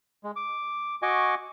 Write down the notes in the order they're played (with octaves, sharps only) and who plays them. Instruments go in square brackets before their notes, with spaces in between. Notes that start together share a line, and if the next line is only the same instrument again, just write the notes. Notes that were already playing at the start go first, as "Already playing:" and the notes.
[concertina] G#3
D6
F#4 D#5 G#5 C#6 D6